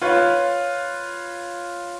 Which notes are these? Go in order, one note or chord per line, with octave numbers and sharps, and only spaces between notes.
F4 B4 C#5